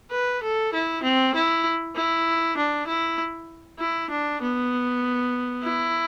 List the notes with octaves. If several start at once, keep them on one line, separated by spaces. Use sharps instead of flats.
B4
A4
E4
C4
E4
E4
D4
E4
E4
D4
B3
E4